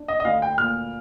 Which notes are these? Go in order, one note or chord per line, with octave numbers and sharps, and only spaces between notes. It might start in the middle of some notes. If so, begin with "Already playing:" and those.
Already playing: D4
D#5
D#5
D2 F5
G5
A#2 F6